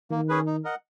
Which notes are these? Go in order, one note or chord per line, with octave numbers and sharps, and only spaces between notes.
D#3 A#3
C#4 G#4 B4
D#4
A#4 D#5 F#5